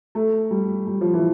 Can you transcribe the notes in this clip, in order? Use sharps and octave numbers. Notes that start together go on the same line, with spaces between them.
A3
G3
G3
F3
E3